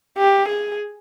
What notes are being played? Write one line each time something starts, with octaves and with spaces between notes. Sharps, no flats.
G4
G#4